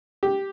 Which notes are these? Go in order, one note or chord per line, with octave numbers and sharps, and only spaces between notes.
G4